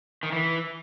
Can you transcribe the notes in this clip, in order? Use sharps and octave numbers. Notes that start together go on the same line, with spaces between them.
D#3
E3